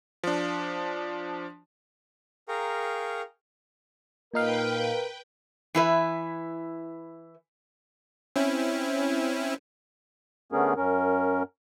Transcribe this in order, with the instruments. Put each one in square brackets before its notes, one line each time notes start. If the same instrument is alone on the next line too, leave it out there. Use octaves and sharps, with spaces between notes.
[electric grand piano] F3 D4
[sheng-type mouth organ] G#4 A#4 F5 G5 A#5 C#6
[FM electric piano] A#2 D#4 F5 [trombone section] A#4 [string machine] B4 G5
[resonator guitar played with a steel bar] E3 E4 B4
[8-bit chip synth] C4 C#4 E4
[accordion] D3 A3 B3 C#4 G#4 A#4
F#2 C#4 A#4